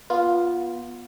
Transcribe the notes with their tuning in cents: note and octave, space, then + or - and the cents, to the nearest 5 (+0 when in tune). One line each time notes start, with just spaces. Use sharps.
B3 -25 F4 +0